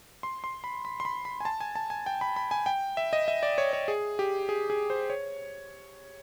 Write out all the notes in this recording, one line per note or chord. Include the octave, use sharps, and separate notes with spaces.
C6
C6
B5
B5
C6
B5
B5
G#5
A5
G#5
A5
G#5
G5
B5
B5
G#5
G5
E5
D#5
E5
D5
C#5
C#5
G#4
G4
G#4
G#4
C5
C#5